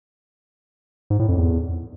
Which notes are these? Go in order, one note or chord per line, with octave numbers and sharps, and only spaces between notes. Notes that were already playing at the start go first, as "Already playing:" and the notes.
G#2
A2
F2
E2